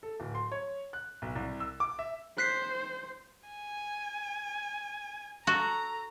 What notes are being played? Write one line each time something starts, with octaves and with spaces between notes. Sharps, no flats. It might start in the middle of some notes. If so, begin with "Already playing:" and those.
A4
D1
C6
C#5
F#6
B1
C2
E6
D6
E5
C5 F#6 B6 C7
G#5
F#4 A4 A#5